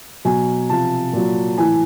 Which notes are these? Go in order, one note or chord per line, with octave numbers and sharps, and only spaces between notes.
B2 F#3 G#5
C3 F3 A5
A#2 F#3
A2 E3 G#5